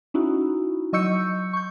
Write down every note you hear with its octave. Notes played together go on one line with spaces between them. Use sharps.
C#4 D#4 E4 F#4
F#3 D#5 C#6 E6 G6 C#7
C#6 G6